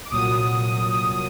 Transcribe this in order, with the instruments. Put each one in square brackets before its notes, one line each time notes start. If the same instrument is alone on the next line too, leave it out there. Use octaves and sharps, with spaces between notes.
[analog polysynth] D6
C2 A#2 F#3 D#6